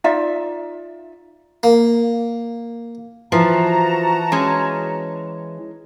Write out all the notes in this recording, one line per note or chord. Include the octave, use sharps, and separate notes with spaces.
D#4 F4 D5 E5
A#3
E3 F3 F#4 A5 A#5
G#3 C#4